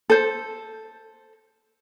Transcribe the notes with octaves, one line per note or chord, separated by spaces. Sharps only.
A4 C5